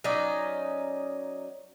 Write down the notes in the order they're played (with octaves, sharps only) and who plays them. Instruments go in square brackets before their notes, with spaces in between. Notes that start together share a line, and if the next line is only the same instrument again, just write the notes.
[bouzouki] F#3 C#4 D#4 D5